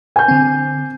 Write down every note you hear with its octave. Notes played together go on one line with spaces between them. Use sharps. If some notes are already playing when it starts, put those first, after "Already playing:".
G#5 G6
D3 C4